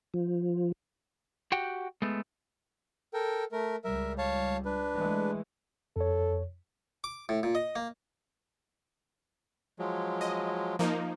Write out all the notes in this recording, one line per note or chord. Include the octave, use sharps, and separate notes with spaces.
F3
F#4 G4 F#5 G5
G#3 A3 B3
A4 A#4 G5
A3 A#4
C#2 G3 A#4 E5
C#5 F5 A5
D4 B4
E3 G#3 A3
F2 A4 C#5
D6
A2
A#2
D#5
A#3
F3 F#3 G#3
D#5
F3 A#3 D#4